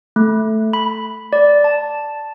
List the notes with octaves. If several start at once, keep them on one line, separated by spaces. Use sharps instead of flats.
A3
B5
D5
A5